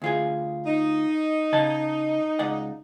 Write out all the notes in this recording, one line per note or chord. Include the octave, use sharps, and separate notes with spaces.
D2 F4 G#4
D#4
C#3 D#5 A5
C#2 D5 F#5